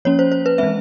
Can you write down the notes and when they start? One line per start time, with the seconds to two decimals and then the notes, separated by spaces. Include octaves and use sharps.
0.05 F3 A#3 C#4 C#5
0.19 C5
0.32 C5
0.46 B4
0.58 E3 G#3 C4 E5